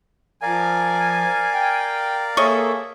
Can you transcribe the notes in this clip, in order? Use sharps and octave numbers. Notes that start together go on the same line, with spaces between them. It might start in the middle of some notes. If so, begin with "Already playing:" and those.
F3 A#4 D5 F5 G#5
G5
A#3 G#4 A4 C#5 D#5 E5 C#6